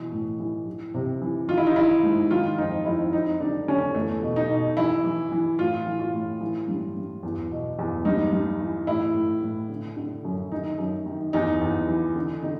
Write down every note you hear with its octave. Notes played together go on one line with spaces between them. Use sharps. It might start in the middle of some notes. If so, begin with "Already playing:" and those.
Already playing: B2 E3
A2
E3
E3
C3
E3
D#3 F4
E4
D#4
D#3 E4
G#2
D#3 F4
F2 D#4
F2 E4
F2 D#4
D3 D4
D3 C#4
E2 A3
B2
D#4
B2
E3 E4
E3
E3
A2 F4
E3
F4
A2
E3
G2
G2
E2
B2
E2
G2 D#4
G2
E3
A2 E4
A2
A2
D3
D3
F#2
D#3 D#4
F#2
D#3
E2 D#4
E2
E3
D3
D3 D#4